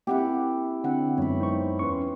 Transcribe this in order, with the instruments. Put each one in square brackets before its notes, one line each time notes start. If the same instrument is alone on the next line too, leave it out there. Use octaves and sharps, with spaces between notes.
[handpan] A#3 C4 F#5 [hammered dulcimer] E4 G4
[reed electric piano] D3 C4 D4 [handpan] F#5
[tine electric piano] F#2 F#3 G#3 [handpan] B3 [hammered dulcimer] C#5 B5
[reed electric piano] D#4 C5 C#6
[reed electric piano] E2 C#4 B4 [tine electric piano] C6 C#6